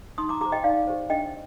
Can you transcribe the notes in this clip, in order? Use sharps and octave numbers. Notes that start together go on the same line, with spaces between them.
D#4 C6 D#6
A#5 D6
G4 C5 A#5 D6
D#5 G5
D#4 D5 F5
G4 C5
D4 D#5 G5